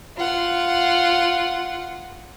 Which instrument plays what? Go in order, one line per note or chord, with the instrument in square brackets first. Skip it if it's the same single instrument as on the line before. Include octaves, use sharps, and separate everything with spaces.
[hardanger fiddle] F4 F#5